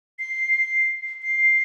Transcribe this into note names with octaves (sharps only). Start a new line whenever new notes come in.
C7
C7